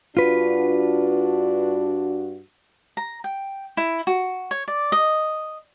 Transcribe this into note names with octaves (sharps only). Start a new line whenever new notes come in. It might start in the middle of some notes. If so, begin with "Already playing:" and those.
G2 D4 F4 F#4 B4
A#5
G5
E4
F#4
C#5
D5
D#5